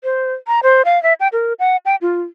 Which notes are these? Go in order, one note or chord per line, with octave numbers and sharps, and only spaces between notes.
C5
A#5
C5
F5
E5
G5
A#4
F#5
G5
F4